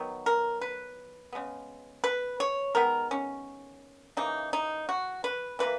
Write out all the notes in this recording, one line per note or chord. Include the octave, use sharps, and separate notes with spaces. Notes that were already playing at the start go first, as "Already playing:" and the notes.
Already playing: D#3 F#3 B3
A#4
B4
C#3 G#3 B3
B4
C#5
D#3 G#3 B3 A#4
C#4
C#3 E3 A#3 D#4
D#4
F#4
B4
E3 A#3 B4